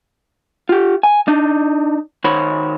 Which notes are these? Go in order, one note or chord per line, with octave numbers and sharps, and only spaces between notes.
F4 G4
G#5
D4 D#4
D#3 C5 C#5 B5